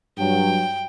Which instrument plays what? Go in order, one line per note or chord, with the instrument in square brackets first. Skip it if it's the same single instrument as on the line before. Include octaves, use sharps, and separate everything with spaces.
[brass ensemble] G2 F#3 [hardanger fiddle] G5